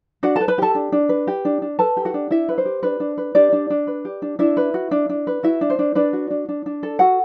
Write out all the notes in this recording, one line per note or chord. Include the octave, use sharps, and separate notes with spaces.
D4 F#4 F#5
A4 B4 A5
B4 B5
G4 A4 A5
D4
D4
B4
G4
D4
D4
A4 B4 A5
G4
F#4 F#5
D4
D4 E4 E5
B4
C5
G4
D4 B4
D4
B4
D4 G4 D5
D4
D4
B4
G4
D4
D4 E4 E5
B4
F#4
D4
D4
B4
E4 F#4 E5
D4
C5
D4
D4 B4 D5
F#4
D4
D4
D4
A4
F#4 A4 F#5